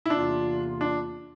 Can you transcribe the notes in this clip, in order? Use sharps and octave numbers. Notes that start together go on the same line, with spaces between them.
E4
E2 C3 E3 A#3 D4 F4
D4